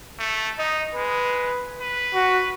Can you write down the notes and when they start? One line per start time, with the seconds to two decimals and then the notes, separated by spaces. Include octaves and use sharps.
0.19 A3
0.59 D#4 D#5
0.95 G#3 B4
1.81 B4
2.14 F#4